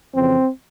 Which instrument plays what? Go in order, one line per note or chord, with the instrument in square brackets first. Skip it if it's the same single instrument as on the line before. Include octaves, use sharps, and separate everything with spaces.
[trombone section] F2 C#3 E3 C4